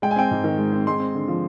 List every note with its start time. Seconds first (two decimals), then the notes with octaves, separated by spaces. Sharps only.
0.02 G#3 G5
0.11 G#5
0.16 C4 G5
0.31 G#2
0.44 D#3
0.58 G#3
0.73 C4
0.87 G#3 C6
1.00 C4
1.14 D3
1.28 F3